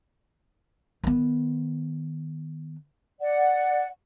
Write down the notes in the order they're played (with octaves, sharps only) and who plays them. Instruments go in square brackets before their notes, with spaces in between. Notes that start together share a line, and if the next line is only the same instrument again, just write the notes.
[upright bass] D#3 B3
[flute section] D5 F#5